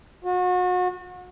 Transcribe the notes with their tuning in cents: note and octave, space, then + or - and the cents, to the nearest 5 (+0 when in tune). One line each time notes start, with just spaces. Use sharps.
F#4 -35